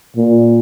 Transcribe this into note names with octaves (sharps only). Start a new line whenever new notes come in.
A#2